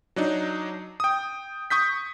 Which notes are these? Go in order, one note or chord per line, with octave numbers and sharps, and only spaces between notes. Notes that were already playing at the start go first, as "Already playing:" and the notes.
F#3 D4 D#4
G5 D#6
C#6 D#6 G6 B6